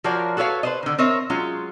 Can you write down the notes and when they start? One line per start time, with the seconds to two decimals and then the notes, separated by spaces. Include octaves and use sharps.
0.04 F3 F4 F#4 A#4 C#5 D5
0.37 F#4 A4 B4 C#5 F5
0.63 B4 C5 D#5
0.83 D3 D#3
0.98 C4 A#4 C#5 D#5 E5
1.30 F#3 G#3 C#4 F4